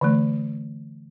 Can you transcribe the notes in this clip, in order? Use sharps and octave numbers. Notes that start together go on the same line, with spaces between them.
D3 E3 A3